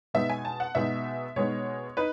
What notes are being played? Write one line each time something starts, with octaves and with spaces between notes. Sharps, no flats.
B2 G#3 B3 D#4 E5
G#5
A5
F#5
B2 G#3 B3 D#4 E5
B2 G#3 B3 D#4 C#5
D#4 B4